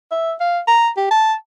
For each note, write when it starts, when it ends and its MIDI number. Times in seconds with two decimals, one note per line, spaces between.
0.11 0.34 76
0.40 0.60 77
0.68 0.89 82
0.97 1.10 67
1.11 1.34 81